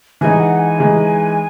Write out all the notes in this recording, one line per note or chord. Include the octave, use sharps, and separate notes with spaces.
E3 G#3 D#4 G#5
F#5
G#5
E3 G#3 D#4